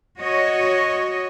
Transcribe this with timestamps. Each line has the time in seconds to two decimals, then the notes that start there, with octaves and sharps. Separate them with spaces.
0.20 F#4 C#5 D#5